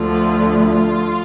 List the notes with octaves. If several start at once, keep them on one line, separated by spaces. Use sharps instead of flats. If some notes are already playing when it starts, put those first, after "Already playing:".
Already playing: D2 D3 F3 F4
F4